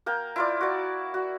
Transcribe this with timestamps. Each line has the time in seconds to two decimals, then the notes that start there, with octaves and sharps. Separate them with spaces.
0.06 A#3 A#4 G5
0.36 E4 F4 D5
0.61 F#4 D5
1.14 F#4